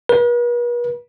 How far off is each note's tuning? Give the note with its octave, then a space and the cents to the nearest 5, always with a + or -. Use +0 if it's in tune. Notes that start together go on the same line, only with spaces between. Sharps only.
B4 -45